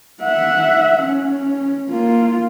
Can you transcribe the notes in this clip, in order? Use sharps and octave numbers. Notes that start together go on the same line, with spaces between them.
E5 F#5
C#4
A#3 F4